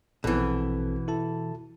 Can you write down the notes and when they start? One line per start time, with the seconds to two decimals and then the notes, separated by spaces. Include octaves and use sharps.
0.24 A#1 B2 E3 C4 A4
1.08 E4 A4 A5